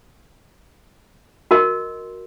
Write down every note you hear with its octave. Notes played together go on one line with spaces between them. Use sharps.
F#4 A#4 D#5 C6